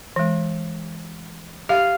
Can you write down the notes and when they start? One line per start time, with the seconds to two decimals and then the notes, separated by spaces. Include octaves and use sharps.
0.16 E3 G#3
1.69 G4 F5